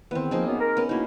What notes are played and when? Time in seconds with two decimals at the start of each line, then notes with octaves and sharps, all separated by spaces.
0.11 E2 D#3 B3 C4
0.31 F3 A#3 D#4 G#4
0.46 F#2 B3
0.59 A#4
0.77 B3 C#4
0.89 B2 A#3 D#4 E4